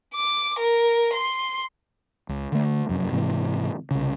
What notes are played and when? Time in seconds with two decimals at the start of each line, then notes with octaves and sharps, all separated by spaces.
0.15 D6
0.59 A#4
1.14 C6
2.29 C#2
2.52 D3 A3
2.89 F1 F#2
3.12 G#2 C3 E3
3.91 C2 C#3